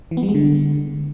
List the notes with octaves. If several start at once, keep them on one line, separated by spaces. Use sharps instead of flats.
E3
B3
G3
G#3
D3